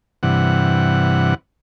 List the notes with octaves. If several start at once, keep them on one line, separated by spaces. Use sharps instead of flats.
G2 C3 E3 F#5